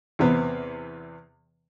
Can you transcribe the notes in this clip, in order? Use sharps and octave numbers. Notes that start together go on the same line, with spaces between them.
E2 C3 B3